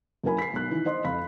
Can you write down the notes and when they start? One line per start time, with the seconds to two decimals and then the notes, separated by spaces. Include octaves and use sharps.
0.24 F#2 A#3 E4 A#4 G#5 B5
0.39 B6 C7
0.53 B1 F#6
0.71 D#3 E3
0.86 C5 D#5 C6
1.04 F2 F5 B5 B6